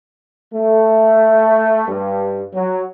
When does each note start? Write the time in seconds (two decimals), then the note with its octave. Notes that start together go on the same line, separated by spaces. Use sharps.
0.53 A3
1.88 G2
2.53 F#3